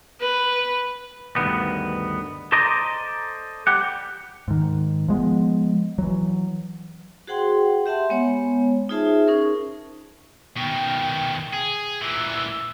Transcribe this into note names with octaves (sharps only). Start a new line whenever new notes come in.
B4
D2 G2 D#3 B3
A4 C5 D5 D#5 A#5
G3 G4 F#5
G#2 D#3
F3 G#3 B3
E3 F#3
F#4 G#4 C5 F#5 G5 C6
G4 E5 F#5 A5 C6
G#3 B3 C#5
D#4 F4 G#4 C5 E5 A5
C#4 D#4 G#4 A#4
B2 D#3 G5
G#4
A#2 E3 E6